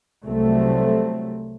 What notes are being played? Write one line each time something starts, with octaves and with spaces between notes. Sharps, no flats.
C2 F#3 A3 C4